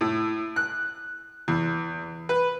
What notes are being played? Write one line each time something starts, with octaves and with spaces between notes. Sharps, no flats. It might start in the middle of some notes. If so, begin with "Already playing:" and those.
A2
F#6
E2
B4